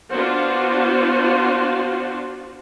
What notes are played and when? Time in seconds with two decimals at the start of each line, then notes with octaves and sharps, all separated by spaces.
0.12 B3 D4 F4 F#4 C5